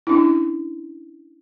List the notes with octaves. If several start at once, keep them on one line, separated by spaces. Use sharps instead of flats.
C#4 D4 E4